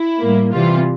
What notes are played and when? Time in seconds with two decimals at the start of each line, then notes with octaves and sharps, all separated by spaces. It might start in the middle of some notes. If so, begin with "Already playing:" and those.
Already playing: E4
0.21 A2 G3 A#3
0.52 C3 E3 G3 F4